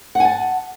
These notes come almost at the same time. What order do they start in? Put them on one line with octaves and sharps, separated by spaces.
F#5 G#5 A5